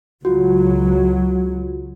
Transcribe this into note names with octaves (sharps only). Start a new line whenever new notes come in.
C#2 F#3 F4 F#4